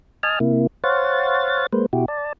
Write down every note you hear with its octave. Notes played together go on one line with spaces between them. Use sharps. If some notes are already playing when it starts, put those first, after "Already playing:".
D#5 G#5 A5 F6
C3 A#3 E4
C5 C#5 F5 F#5 A6
G#3 A#3 B4 C5
B2 E4 F#4 G4
D5 A5